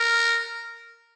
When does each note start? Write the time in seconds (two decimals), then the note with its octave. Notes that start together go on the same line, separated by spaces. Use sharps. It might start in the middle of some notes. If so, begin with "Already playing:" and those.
Already playing: A#4